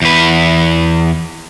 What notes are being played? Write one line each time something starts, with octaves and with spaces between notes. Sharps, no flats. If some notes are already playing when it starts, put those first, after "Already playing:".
E2 B4